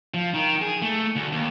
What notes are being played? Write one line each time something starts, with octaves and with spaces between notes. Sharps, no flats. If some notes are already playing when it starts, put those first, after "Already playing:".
F3
D#3
G#4
A3
D2
D#2